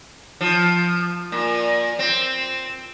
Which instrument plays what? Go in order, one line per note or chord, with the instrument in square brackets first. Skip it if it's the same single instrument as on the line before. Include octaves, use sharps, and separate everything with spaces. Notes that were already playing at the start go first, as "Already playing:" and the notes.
[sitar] F3
A#2
C4